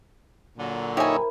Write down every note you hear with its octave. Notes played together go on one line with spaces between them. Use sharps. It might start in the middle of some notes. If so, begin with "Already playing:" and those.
A#2 D3 F#3
D#4 E4 G4 A#4 C5 C#5 E5 G#5